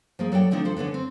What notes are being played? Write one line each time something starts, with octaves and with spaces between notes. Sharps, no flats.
F3 A#3 G#4
F#3 A4 D5 G5
D3 F3 A3 C4 D4 D#4
F3 A4 C5
D3 B3 C#4 D4
C4